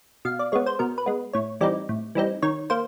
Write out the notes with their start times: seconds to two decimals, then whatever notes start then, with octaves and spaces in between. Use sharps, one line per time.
0.25 B2 F5
0.39 D5
0.52 G#3 B3 C#5
0.66 C5
0.79 B2 A#4
0.98 B4
1.06 G#3 B3
1.33 A2 C#5
1.61 E3 G3 C4 D#4 D5
1.89 A2
2.15 E3 G3 C4 D#4
2.43 D#3 C#5
2.70 A#3 C5